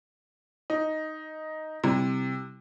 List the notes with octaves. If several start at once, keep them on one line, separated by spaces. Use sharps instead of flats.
D#4
C3 G3 E4